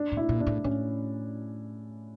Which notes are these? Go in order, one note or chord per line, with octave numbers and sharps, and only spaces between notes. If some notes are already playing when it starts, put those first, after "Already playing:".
Already playing: D4
A2
E4
A#2
D4
A2
A2 C#4